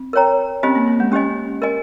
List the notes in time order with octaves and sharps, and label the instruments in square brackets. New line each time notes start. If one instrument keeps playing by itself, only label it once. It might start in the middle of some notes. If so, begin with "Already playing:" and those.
Already playing: [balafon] C4
[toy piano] A#4 C#5 G5 A#5
[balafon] C4 [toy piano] C#4 G4 C5 D#5 G#5
[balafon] A#3
A#3
G#3
[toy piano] C#4 G4 C5 D#5 G#5
A#4 D#5 G#5